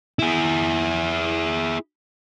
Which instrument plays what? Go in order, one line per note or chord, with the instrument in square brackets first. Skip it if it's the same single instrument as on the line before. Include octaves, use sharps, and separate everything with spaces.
[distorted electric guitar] E4 G#4